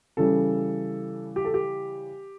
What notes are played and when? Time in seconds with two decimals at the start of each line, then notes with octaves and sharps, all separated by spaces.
0.17 C#3 E3 G3 A4
1.36 G4
1.45 A4
1.54 G4